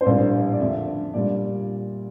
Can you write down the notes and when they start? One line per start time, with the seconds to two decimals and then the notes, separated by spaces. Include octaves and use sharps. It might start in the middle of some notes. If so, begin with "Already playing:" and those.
0.01 C5
0.05 A#1 A2 G3 A#3 D5
0.53 D5
0.60 F2 D3 A3 E5
1.14 A#2 G3 D5